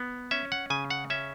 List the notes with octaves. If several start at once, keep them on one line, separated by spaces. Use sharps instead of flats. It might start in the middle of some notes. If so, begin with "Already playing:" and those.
Already playing: B3
C#4 E5
F#5
C#3 G#5
F#5
C#4 E5